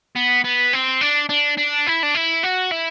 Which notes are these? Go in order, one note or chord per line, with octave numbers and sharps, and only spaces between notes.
B3
B3
C4
D4
D4
D4
E4
D4
E4
F#4
E4